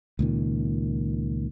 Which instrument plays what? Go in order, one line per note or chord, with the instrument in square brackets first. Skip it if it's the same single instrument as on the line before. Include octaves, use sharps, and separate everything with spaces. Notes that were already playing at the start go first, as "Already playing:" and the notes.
[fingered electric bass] C#2 A#2 D#3